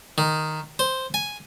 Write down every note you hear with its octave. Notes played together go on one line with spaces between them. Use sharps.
D#3
C5
G#5